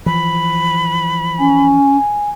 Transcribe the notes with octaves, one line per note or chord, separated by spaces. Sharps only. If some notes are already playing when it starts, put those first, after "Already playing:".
E3 F3 B5
C#4 G#5